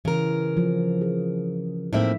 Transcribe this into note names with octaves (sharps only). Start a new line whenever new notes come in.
C#3 E3 A#4
F3
G#4
A2 A#3 C4 D#4 E5